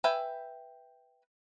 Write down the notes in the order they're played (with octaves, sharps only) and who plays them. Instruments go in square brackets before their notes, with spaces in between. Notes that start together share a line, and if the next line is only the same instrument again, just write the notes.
[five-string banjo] B4 E5 G5 G#5